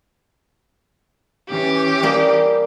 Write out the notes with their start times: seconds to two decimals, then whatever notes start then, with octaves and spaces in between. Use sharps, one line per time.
1.50 E3 C#4 G4
2.03 G3 A#3 G#4